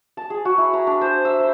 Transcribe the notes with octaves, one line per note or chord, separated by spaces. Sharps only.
A5
G#4
F#4
E4
A#5
D4
C5
E5
C5